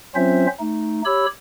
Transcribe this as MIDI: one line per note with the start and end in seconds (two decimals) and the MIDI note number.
0.15 0.47 54
0.15 0.47 60
0.15 0.47 61
0.15 0.47 65
0.15 0.47 72
0.15 0.47 76
0.60 1.02 57
0.60 1.02 63
1.05 1.26 67
1.05 1.26 73
1.05 1.26 83
1.05 1.26 88